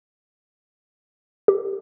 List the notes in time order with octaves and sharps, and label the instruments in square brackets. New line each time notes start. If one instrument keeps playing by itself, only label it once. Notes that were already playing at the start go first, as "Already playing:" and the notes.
[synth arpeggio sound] G4